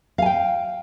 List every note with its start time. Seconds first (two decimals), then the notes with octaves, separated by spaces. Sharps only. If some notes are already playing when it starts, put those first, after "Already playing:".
0.18 F5
0.22 G#5
0.26 G5